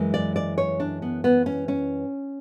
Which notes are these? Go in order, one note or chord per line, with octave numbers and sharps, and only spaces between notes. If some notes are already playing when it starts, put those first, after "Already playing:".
Already playing: F#2 E3 G#3
D5
D5
C#5
D4
B3
B3
C#4
C#4